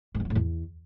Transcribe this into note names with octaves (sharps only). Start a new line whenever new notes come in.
G#2
F2
F3
A2
E2